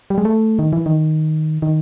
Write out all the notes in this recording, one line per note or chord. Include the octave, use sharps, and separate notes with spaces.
G3
G#3
A3
D#3
E3
D#3
D#3